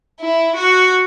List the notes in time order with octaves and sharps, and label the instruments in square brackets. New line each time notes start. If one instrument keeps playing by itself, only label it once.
[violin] E4
F#4